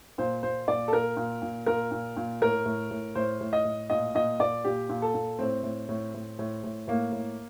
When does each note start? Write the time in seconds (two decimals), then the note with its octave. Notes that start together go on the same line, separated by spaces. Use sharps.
0.18 A#2 C5
0.43 A#2 C5
0.68 A#2 D5
0.88 A4
0.93 A#2 A#4
1.17 A#2
1.42 A#2
1.66 A#2 A#4
1.91 A#2
2.17 A#2
2.41 A2 A#4
2.66 A2
2.91 A2
3.15 A2 C5
3.41 A2
3.53 D#5
3.65 A2
3.90 A#2 D#5
4.15 A#2 D#5
4.39 A#2 D5
4.64 A#2 G4
4.89 A#2
5.02 A4
5.14 A#2
5.39 A2 C4
5.63 A2
5.89 A2
6.14 A2
6.39 A2
6.64 A2
6.88 A2 A#3
7.12 A2